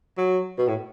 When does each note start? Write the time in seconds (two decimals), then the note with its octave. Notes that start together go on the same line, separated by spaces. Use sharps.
0.18 F#3
0.58 B2
0.68 A2